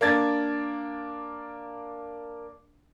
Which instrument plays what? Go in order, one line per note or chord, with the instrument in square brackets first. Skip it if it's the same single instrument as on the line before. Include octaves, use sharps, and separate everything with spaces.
[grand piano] A#3 D4 G#6 A6